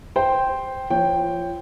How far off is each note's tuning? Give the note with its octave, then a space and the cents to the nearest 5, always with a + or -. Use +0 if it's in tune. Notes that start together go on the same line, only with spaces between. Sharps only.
C5 +0 G5 +0
F3 -25 C#5 +0 G5 +0